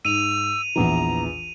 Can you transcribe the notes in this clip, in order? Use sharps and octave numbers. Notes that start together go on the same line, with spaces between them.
G#2 E6 D#7 F7
A#1 E2 E3 A#5